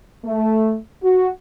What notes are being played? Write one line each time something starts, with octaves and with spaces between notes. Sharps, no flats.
A3
F#4